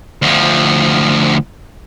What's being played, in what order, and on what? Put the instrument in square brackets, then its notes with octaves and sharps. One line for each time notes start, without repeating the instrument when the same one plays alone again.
[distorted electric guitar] D2 F3